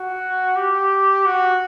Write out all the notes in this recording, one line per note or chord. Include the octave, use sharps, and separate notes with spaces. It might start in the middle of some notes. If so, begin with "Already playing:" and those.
Already playing: F#4
G4
F#4